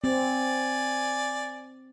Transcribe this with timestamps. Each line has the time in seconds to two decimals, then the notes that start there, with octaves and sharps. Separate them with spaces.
0.04 C4 D5 G#5